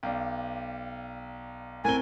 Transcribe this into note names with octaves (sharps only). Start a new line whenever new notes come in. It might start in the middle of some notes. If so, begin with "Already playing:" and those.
B1 D5 F5 G5
A2 C4 A#4 G#5 G7